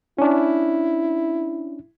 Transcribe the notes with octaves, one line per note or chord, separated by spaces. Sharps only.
C#4 D4 E4